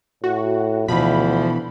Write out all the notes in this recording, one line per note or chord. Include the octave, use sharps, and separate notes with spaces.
A2 F#4
D2 B2 E3 F3 B5